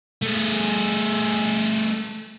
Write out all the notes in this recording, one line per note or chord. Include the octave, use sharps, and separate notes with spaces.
A3 G#4